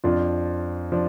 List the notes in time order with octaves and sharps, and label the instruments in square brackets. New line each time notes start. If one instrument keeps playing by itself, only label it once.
[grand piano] F2 F3 D4 F4
F3 D4